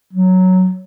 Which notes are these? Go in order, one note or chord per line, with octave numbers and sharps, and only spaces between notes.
F#3